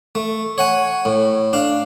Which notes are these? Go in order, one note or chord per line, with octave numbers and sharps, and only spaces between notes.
A3
C#5 F#5 G#5
A2
D4 F5